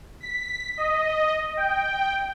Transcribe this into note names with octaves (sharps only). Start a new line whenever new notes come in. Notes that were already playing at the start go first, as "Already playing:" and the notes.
B6
D#5
G5